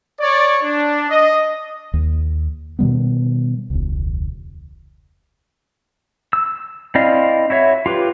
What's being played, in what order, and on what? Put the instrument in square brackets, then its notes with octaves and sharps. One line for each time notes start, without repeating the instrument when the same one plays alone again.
[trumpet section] C#5 D5
D4
D#5
[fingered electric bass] D#2
B2 D#3 G3 B3
E1 C#2
[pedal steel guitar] E6
C4 E4 D5 D#5 F5
E4 F#4 C#5 E5
F4 G4 B4